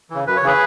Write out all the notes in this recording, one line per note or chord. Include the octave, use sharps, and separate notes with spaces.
C#3 E3
F#2 B4
C#5
C#3 E3 G#4 B4